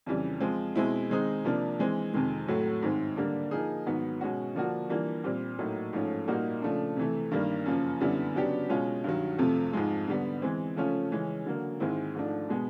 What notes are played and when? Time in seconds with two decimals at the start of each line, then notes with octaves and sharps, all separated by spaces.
0.06 F2 C#3 E3 G3
0.41 F3 G#3 C4
0.76 B2 G#3 C4 E4
1.10 D#3 G#3 C4 D#4 G#4
1.44 C3 F3 A#3 D4
1.79 E3 G#3 C4
2.14 F2 C3 D#3 G#3
2.48 A2 F#3 A3
2.82 G#2 D#3 G#3 C4
3.17 D3 G3 A#3 D4
3.51 F3 A#3 D#4 G#4
3.86 G#2 D#3 F#3 B3
4.21 B2 G#3 C#4 F#4
4.55 D3 F3 A#3 D4 F#4
4.90 E3 G3 A#3 D4 F4
5.24 A#2 G3 C4
5.59 A2 F#3 A#3 D#4
5.93 G#2 F3 A3 C#4
6.28 A#2 G3 A#3 D#4 F#4
6.62 C#3 F3 A3 D4
6.97 C3 E3 A3
7.31 G2 D#3 G3 A#3
7.66 F#2 C#3 F3 A#3
8.00 F#2 D3 G3 B3 E4
8.35 C#3 F#3 B3 D4 G4
8.69 B2 G#3 C#4 F4
9.04 G2 D#3 F#3
9.38 F2 C3 F3 A3
9.73 G#2 F3 G#3
10.08 D3 G3 B3
10.42 E3 G#3 C4
10.76 C#3 F3 A3 C#4 F4
11.11 C#3 E3 G#3 C#4
11.46 D3 F#3 A#3
11.80 G#2 D#3 G#3 C4 E4
12.15 G#2 F3 A3 D4
12.49 B2 G#3 B3